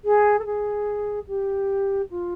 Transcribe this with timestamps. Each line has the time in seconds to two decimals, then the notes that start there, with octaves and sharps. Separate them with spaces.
0.04 G#4
0.39 A4
0.45 G#4
1.27 G4
2.10 F4